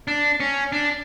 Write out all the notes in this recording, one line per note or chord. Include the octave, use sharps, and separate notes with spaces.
D4
C#4
D4